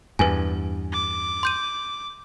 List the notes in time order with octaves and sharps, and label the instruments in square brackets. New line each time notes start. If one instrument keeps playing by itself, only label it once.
[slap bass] E2 G2 [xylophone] B4 G#5
[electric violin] D6
[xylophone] C6 G6 D#7